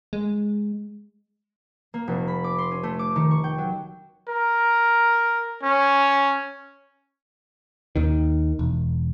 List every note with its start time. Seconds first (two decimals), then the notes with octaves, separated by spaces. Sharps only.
0.13 G#3
1.94 A#3
2.08 F1
2.28 B5
2.44 D6
2.58 C6
2.71 C#4
2.83 A3
2.99 D6
3.16 D#3
3.31 C#6
3.44 G5
3.58 F#3
4.29 A#4
5.63 C#4
7.96 D#2 D#3
8.59 E1